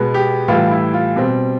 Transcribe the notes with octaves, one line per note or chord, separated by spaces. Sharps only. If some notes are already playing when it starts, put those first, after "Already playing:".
Already playing: B2 G#3 B3
G4
A2 E3 G3 F4
E4
F4
B2 G3 C4